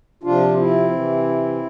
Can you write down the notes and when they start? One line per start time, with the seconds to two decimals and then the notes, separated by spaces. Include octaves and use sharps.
0.23 C3 F3 D4 F4
0.57 C4 E4
0.91 C3 E3